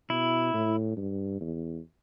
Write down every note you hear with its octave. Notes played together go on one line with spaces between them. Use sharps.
B2 E4
A2
G2
E2